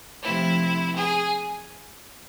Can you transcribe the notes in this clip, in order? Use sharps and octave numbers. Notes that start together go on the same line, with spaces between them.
C3 F3 A3 C4 E4
G#4